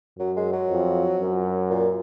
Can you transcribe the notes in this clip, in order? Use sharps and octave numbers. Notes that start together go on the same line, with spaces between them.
F#2 F#3
G#3
F#3
F2
F#2
A#2